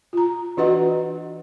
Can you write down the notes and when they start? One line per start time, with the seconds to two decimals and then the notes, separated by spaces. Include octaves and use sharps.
0.13 F4 A#5
0.57 E3 D4 F#4 B4 D#5 F#5